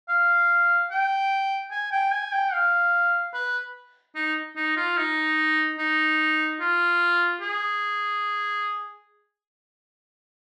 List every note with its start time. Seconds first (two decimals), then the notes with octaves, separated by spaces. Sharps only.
0.09 F5
0.90 G5
1.71 G#5
1.92 G5
2.12 G#5
2.32 G5
2.53 F5
3.34 B4
4.15 D#4
4.56 D#4
4.76 F4
4.97 D#4
5.78 D#4
6.60 F4
7.41 G#4